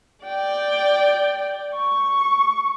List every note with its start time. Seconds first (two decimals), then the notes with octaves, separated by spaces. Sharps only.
0.24 D5 G5
1.74 C#6